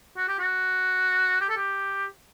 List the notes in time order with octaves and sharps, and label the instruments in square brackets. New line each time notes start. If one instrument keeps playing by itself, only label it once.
[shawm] F#4
G4
F#4
G4
A4
G4